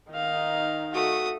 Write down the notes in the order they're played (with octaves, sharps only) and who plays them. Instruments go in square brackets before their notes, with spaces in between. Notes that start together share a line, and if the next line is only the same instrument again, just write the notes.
[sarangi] D#3 [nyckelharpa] D#4 F5
[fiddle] A3 D#6 [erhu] F#4